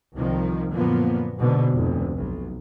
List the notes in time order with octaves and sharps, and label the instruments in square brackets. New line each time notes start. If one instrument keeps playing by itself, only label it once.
[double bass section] C2 D#3 F3
F#2 A#2 D3 F3 A#3 B3
G#2 B2 D3
F1 D2
B1